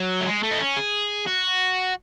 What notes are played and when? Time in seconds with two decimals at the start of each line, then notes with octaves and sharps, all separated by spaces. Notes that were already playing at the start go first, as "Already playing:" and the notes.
Already playing: F#3
0.20 A3
0.26 G#3
0.43 A3
0.51 D#4
0.60 C#4
0.77 G#4
1.27 F#4